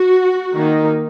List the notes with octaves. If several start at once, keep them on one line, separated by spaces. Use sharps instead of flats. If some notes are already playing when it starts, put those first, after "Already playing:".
Already playing: F#4
D#3 A#3 D#4